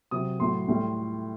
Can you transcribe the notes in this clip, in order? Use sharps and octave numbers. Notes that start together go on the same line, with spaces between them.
C3 F#3 D#6
A2 F#3 C6
A2 G3